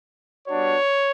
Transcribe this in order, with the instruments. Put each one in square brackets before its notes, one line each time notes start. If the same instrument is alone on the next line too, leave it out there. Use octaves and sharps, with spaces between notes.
[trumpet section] G3 B3 D4 F#4 C#5